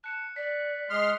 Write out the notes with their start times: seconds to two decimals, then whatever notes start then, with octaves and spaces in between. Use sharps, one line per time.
0.04 A5 F#6 C#7
0.36 D5 B6
0.90 G#3 C6 D#6 F6